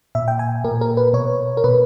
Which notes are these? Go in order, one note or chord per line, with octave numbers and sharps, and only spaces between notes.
A#2 E5
G5
G#5
A#2 A#4
A#4
B4
B2 C#5
A#4
B2 B4